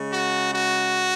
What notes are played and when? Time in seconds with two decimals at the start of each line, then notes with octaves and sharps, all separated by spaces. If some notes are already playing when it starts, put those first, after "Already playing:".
Already playing: C#3 G#3
0.12 F#4
0.55 F#4